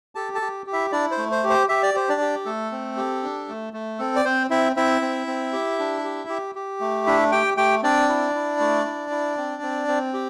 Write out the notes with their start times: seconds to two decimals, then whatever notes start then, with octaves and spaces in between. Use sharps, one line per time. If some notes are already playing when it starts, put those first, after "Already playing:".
0.15 G4 A4 A5
0.35 A4 A5
0.41 G4
0.66 G4
0.73 E4 E5
0.92 D4 E4 D5
1.11 C5
1.18 A3
1.31 C5
1.44 G4
1.50 C5
1.69 G4 E5
1.83 D5
1.94 G4 C5
2.09 D4 D5
2.21 G4
2.45 A3 A4
2.72 C4
2.97 G4
3.23 D4
3.49 A3
3.73 A3
3.99 C4 A4
4.16 D5
4.25 C4 C5
4.50 C4 E4 E5
4.76 C4 E4 E5
5.02 C4
5.27 C4
5.53 G4
5.79 D4
6.04 G4
6.29 G4
6.55 G4
6.80 A3
7.06 D4 E4 E5
7.32 G4 G5
7.57 A3 G4 G5
7.83 C4 D4 D5
8.09 E4
8.35 E4
8.60 A3
8.85 E4
9.11 E4
9.37 C4
9.62 C4
9.88 C4
10.14 G4